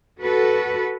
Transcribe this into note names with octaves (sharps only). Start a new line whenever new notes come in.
F#4 A4 B4